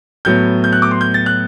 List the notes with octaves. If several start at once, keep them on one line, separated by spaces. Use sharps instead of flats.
A2 F#3 B3 G6
G6
F#6
D6
C6
G6
A6
F#6